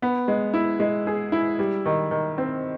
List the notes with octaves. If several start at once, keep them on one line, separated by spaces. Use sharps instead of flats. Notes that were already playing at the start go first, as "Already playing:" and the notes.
B3
G#3
E4
G#3
G#4
E4
G3
D#3
D#3
C4